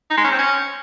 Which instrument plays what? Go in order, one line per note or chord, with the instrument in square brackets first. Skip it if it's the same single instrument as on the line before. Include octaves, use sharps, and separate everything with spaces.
[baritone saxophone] D#4
G#3
C#4
C4
C#4